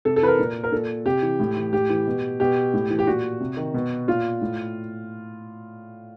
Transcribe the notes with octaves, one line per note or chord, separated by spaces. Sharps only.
C3 A4
A4
E3 B4
A#4
A#2
A#4
A#2 A4
C3 G4
E3
A2
E3
A2 G4
E3
B2
B2 G4
A2
E3
G4
A#2 F#4
C3
D#3
B2
A#2 F4
A2